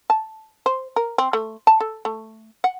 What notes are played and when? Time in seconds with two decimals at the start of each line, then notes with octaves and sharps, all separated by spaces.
0.10 A5
0.66 C5
0.96 A#4
1.18 C4
1.33 A3
1.67 A5
1.80 A4
2.05 A3
2.64 F#5